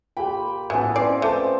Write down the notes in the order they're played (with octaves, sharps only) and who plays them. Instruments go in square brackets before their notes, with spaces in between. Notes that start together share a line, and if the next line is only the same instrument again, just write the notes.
[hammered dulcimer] A#2 B5 [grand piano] G4 G5
[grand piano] A2 B3 [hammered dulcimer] E3 G#4 A4 [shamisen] F#3
[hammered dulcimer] F3 C4 F4 [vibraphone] C#4 B4 D#5 [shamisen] D5 [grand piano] C7
[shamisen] A3 [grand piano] C5 A5 D6